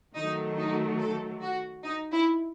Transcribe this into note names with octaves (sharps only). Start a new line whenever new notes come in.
D#3 F#3 A3 D#4
D#4
A4
F#4
D#4
E4